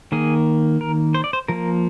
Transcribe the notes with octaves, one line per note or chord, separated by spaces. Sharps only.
D#3 A#3 G#4
A#4
C5
D5
C5
F3 A#3 A#4